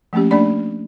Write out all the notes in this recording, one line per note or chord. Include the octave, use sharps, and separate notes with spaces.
F3 A3 A#3 C#4 G4
A3 A#3 D4 D5 B5